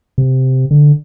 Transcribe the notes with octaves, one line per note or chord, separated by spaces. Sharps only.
C3
D3